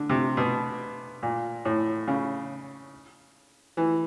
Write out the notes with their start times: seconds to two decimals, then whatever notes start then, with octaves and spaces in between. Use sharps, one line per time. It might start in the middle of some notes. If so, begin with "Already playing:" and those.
Already playing: D3
0.09 C3
0.37 B2
1.23 A#2
1.65 A2
2.08 C#3
3.77 E3